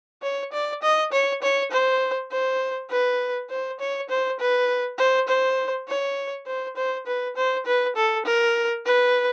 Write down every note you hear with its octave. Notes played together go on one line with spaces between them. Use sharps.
C#5
D5
D#5
C#5
C#5
C5
C5
B4
C5
C#5
C5
B4
C5
C5
C#5
C5
C5
B4
C5
B4
A4
A#4
B4